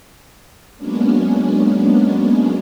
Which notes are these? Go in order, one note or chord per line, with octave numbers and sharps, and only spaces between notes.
F#3 G#3 A#3 B3 C#4 D4